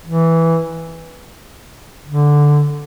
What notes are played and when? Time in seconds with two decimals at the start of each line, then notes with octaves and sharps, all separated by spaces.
0.06 E3
2.07 D3